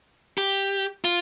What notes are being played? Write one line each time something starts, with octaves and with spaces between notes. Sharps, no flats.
G4
F4